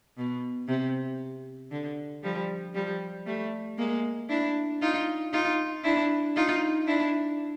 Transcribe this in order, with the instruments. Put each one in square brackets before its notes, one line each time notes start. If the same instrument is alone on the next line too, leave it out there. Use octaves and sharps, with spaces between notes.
[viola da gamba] B2
C3
D3
F3 G3
F3 G3
G3 A3
G#3 A#3
D4 E4
D#4 F4
D#4 F4
D4 E4
D#4 F4
D4 E4